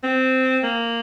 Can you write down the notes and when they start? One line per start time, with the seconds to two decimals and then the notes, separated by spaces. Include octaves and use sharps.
0.04 C4
0.63 A#3